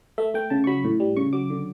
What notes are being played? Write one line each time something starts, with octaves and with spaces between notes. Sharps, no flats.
A3 E5
A3 G5
C#3 A5
C#6
F#3 B5
A2
G3
C#3 C#6
F#3 D6
D3